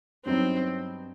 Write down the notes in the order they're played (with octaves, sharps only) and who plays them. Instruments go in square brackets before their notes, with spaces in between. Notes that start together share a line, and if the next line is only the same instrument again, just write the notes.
[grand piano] G2 F#3 B3 D#4 [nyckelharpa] C4